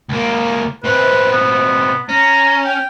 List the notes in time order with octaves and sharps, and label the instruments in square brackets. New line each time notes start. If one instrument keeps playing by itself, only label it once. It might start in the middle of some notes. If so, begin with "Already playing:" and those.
[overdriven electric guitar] C#2 A#3
[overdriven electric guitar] B2 C4 [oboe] B4
[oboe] B3
[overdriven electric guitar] C#4 [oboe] A#5
[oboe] G5